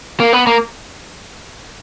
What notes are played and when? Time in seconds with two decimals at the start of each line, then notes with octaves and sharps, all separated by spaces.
0.20 A#3
0.33 B3
0.47 A#3